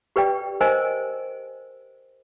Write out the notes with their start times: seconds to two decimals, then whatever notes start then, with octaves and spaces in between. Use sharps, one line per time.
0.16 G4 B4 D5 G5
0.61 A#4 C5 D#5 G#5